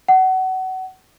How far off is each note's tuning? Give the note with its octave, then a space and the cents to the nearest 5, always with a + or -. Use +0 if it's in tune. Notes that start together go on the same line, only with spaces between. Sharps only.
F#5 +25